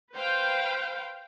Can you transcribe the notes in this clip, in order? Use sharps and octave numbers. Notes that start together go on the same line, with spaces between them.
B4 C5 F5 G5